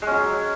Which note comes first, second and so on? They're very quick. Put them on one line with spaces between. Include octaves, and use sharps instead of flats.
G#3 C#4 F#3